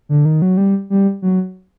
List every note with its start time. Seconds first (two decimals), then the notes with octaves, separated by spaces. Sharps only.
0.09 D3
0.25 D#3
0.42 F#3
0.57 G3
0.90 G3
1.22 F#3